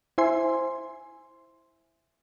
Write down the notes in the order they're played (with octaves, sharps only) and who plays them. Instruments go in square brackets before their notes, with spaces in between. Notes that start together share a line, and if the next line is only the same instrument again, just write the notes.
[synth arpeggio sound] E4 C5 E5 G#5 C6